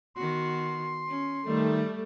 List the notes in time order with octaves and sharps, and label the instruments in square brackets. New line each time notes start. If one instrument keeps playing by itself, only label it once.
[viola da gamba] D#3 B3 F#4 [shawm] C6
[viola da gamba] C#4
[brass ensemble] D#3 [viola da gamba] G3 [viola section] A3